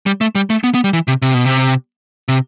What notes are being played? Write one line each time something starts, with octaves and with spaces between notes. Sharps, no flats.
G3
A3
G3
A3
B3
B3
G3
E3
C3
C3
B2
C3
C3